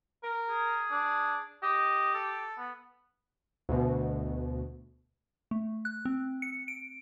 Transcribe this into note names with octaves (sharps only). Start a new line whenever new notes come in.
A#4
G#4
D4
G4 D#5
A4
B3
D2 B2
A3
F#6
C4
C#7
D7